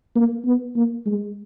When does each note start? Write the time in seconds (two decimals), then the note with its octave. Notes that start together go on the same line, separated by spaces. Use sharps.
0.16 A#3
0.45 B3
0.76 A#3
1.06 G#3